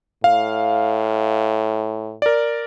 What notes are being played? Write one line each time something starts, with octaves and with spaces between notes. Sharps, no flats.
A2 F5
A#4 D5